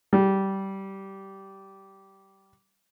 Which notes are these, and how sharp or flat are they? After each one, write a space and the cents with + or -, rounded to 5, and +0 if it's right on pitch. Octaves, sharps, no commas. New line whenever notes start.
G3 -15